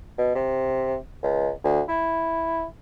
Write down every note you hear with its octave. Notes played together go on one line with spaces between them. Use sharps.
B2
C3
C#2
D2
E4